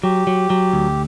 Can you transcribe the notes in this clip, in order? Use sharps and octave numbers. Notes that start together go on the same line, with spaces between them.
F#3 G4
F#3
F#3
D2